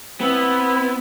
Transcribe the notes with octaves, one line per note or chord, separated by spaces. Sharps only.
B3 C4 E4